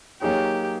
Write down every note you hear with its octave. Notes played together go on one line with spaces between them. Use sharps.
F#3 A#3 D#4 G4 G#4 C#5